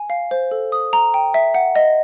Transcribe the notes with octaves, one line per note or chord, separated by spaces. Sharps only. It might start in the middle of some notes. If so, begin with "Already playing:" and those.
Already playing: G#5
F5
C5
A4
D#6
A#5
G5
E5
F#5
D#5